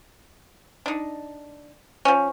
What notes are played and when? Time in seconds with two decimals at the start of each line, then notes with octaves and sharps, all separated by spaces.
0.86 D4 D#4
2.05 F3 C#4